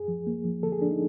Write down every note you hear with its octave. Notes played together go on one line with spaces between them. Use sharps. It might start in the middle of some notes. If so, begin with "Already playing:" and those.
Already playing: F#2 G#4
F3
A#3
F3
D3 A4
G#4
F3 D4
D#4